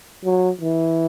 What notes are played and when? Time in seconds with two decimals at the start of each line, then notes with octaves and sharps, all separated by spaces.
0.25 F#3
0.61 E3